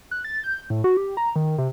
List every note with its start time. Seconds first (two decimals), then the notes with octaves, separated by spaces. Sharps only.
0.11 F#6
0.25 A6
0.44 G6
0.70 A2
0.84 F#4
0.97 G4
1.17 A#5
1.36 D#3
1.58 C3